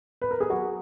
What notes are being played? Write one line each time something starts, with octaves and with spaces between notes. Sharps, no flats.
B4
A#4
G#4
F#3 F#4